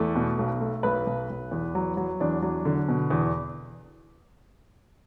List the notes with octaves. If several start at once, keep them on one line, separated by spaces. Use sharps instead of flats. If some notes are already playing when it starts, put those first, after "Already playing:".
Already playing: E2 A3
B2
B1
A3
B1 B4
B1
B1
E2
F#3
F#3
E2 D4
F#3
D3
B2
E2